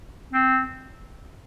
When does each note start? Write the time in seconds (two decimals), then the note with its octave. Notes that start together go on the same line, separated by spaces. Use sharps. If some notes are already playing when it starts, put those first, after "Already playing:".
0.33 C4